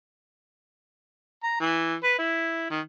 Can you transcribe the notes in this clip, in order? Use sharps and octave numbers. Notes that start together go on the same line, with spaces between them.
A#5
E3
B4
E4
D#3